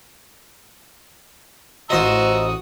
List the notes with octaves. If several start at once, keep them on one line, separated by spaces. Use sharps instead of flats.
A1 F4 F#4 C5 D#5 A#5 D#6 E6